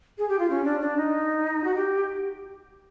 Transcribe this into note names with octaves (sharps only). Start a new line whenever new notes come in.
G#4
G4
F4
C#4
D4
D4
D#4
F#4
G4